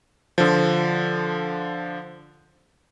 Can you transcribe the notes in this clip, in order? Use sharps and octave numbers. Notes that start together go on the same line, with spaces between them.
D3 F3